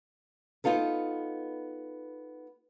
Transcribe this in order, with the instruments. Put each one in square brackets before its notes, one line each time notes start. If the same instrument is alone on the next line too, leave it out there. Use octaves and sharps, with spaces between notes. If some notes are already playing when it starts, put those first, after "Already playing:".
[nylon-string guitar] B3 D#4 F4 A4 B4